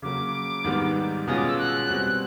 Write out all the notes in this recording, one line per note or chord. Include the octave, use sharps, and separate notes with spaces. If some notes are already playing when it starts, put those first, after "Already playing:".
C#3 F#3 A#3 D6
G#2 D#3 G3 B3
B2 G#3 C#4 F4 D#6
D6
E6
F#6
B2 G3 C4